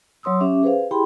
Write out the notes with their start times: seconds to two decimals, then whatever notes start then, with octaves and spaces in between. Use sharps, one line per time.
0.23 F#3 C#5 C6 D#6 E6
0.40 C#4 G4 E5 D6
0.63 G#4 B4 C5 F5
0.91 E4 G4 G#4 G5 B5 C6